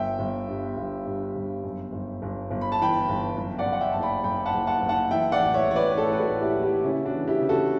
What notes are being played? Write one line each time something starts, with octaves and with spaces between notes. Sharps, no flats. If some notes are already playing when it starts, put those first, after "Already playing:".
Already playing: G1 E5 G5
G1
G2
G1
G2
G1
F#2
G1
G1
G1
B5
A5
E3 G5 B5
G1
F#2
D5 F#5
F#2
F#5
E5 G5
F#1 A5
G5 B5
F#2 G5 B5
F#5 A5
F#1
F#5 A5
F#1
F#5 A5
E3 E5 G5
D5 F#5
A1
C#5 E5
A1 C#5
B4 D5
B4
A2 A4 C#5
B4
F#4 A4
A2
E4 G4
A1
E4 G4
C#3 C#4 E4
D4 F#4
E3
E4 G4
C#3
F#4 A4